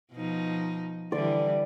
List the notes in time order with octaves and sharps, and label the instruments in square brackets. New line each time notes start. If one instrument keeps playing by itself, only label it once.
[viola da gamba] B2 F3 D#4
[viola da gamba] D3 E3 G3 [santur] D5